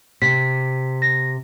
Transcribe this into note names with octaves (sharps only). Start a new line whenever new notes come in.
C3 B6
A#6